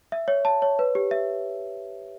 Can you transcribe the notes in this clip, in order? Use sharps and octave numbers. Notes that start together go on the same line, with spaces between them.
E5
C#5
A5
C#5
B4
G4
E5